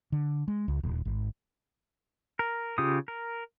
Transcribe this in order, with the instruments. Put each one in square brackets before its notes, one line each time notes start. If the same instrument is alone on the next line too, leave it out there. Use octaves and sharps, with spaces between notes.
[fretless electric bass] D3
G#3
C#2
D#1
G#1
[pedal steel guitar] A#4
C#3 F4 G4 D#6
A#4